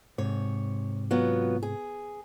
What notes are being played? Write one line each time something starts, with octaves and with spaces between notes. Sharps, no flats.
G#2 C3 C#5
F#3 B3 F4
G#4